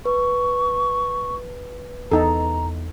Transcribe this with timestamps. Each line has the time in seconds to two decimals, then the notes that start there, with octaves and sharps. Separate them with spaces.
0.05 B4 C#6
2.12 E2 D#4 A4 A#5